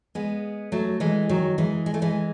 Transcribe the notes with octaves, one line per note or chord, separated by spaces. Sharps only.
G#3 B3
F#3 A3
E3 G#3
D#3 F#3
E3 G#3
G#3
A3
E3 G#3